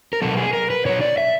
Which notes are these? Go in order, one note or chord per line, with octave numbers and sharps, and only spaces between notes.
A#4
B2 F#3 A4
G#4
A#4
B4
B2 F#3 C#5
D5
E5